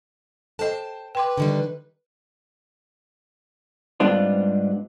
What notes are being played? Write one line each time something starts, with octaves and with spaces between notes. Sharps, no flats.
A4 C5 D#5 G5 A5
B4 G5 C6 D6
D3 D#3 G3
G#2 G3 B3 C4 D4 F4